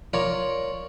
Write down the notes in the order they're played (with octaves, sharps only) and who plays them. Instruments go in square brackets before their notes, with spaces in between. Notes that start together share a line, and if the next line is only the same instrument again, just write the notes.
[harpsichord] F4 A#4 C#5 D5